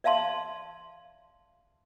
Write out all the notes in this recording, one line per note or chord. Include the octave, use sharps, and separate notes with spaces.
D5 E5 F5 A5 C6